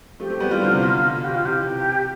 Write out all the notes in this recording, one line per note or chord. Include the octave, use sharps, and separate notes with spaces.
F3 A3 G4
A3 C4
G3 B3
E3 G3 F4
D3 F3
C3 E3
B2 D3
F4
G4
F4
C3 E3 G4
C3 E3